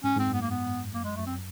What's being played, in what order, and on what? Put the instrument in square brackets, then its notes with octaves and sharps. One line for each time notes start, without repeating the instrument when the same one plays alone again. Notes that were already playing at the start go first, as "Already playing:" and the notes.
[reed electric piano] G#2 [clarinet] C#4
[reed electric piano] G#2
[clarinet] C4
[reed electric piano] F#2
[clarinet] B3
A#3
B3
[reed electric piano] F#2 [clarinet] A#3
[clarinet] G#3
[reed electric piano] F#2 [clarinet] A3
[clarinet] C4